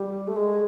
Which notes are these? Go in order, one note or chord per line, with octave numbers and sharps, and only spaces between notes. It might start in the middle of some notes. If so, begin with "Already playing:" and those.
Already playing: G3
A3
G#3